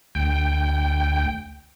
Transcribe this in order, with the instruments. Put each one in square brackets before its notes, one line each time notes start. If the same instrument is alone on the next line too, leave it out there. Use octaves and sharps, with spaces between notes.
[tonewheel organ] D2 G5